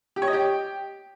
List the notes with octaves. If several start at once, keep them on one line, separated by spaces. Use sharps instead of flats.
G4
C#5
D#5
G4